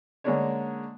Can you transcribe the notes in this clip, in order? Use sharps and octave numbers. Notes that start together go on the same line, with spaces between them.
D3 G#3 A#3 C#4 D4 C#5